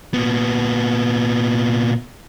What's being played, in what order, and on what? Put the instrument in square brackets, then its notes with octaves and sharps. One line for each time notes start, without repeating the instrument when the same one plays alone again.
[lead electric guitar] A#2 B3